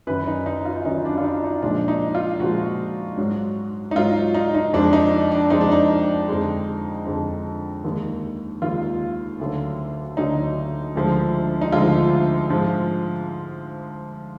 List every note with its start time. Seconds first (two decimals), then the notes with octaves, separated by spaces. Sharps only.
0.07 F#2 D#3 F#3 B4
0.27 D#4
0.46 D#4
0.65 F4
0.85 F#2 D#3 F#3 D#4
1.05 D4
1.18 F4
1.24 D#4
1.44 D#4
1.62 A#2 F3 G#3 D4
1.88 D#4
2.15 F4
2.40 A#2 F3 G#3 F#4
3.17 G#2 F#3
3.91 D#4
3.95 G#2 F#3 F4
4.34 D#4
4.55 D#4
4.73 F2 F3 G#3 D4
4.93 D#4
5.31 D4
5.50 F2 F3 G#3 D#4
5.61 D4
5.72 D#4
6.28 F2 D3 G#3
7.06 F2 D3 G#3
7.84 D#2 D#3 G#3
8.62 D#2 D#3 G#3 F4
9.39 D2 D3 F#3
10.17 D2 D3 F#3 D#4
10.95 D2 D3 F3 G#3
11.61 D#4
11.72 D2 D3 F3 G#3 F4
12.50 G#2 F3 G#3